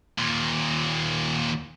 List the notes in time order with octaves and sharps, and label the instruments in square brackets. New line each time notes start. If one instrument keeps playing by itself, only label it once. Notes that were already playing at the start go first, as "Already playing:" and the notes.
[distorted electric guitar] D#2 A#2